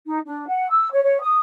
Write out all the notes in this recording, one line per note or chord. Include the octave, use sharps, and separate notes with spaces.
D#4
D4
F#5
E6
C#5
C#5
D#6